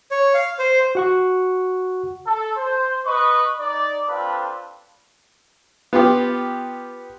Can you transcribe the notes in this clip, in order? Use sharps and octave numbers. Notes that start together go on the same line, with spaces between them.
C#5
F5
C5
F#4 F#5 C#6
A4
C5
B4 D#5 C#6
D#4 D5
C4 D4 F4 A4 B4
B3 F4 G4